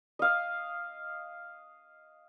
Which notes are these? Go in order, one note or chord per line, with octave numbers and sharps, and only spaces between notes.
D#5 F5